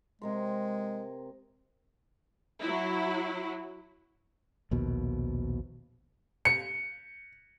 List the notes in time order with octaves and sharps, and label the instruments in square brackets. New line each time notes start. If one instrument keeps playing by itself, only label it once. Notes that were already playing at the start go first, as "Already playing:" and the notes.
[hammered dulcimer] C3 A#4 C6 [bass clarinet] G#3
[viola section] F#3 E4
[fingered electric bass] A#1 D#2 B2
[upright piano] C#7